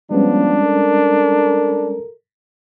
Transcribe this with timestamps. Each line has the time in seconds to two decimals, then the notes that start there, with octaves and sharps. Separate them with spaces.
0.11 F3 G3 G#3 B3 C#4 D4
0.63 A4 A#4